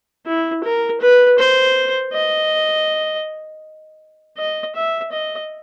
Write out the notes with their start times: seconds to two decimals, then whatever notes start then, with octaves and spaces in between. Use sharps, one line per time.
0.26 E4
0.64 A#4
1.01 B4
1.39 C5
2.13 D#5
4.38 D#5
4.75 E5
5.12 D#5